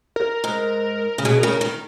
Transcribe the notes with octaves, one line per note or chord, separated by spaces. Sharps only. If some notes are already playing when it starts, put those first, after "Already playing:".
A#4
G#2
C#3
B2 G#4
C#3 A#4
A#4
D#3